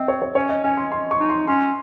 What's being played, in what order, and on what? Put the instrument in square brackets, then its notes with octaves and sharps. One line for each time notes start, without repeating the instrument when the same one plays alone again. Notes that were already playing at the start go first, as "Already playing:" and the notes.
Already playing: [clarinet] C4 [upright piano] D#5 E5
[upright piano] C#5
C#5
[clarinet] C#4 [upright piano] C#5
[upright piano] D#5
[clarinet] C#4 [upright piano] G#5
[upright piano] C6
C6
C#6
[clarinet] D#4
[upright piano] C6
[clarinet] C#4 [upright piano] C6